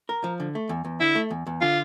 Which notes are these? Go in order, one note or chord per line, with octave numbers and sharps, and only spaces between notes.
A#4
F3
D3
A3
E2
E2
D3 E4
A3
E2
E2
D3 F4